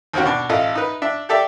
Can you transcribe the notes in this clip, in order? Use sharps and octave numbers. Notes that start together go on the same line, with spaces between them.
D#2 C4 C#4 F#4
B2 D4
A1 F4 A4 D#5
D#4 B4
D4 E5
G4 A4 D5 E5